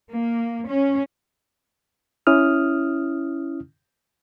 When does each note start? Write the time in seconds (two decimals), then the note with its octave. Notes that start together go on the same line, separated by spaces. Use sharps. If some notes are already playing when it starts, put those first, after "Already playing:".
0.11 A#3
0.67 C#4
2.27 C#4 E4 D#6 F6